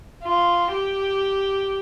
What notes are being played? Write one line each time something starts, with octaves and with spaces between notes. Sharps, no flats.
F4
G4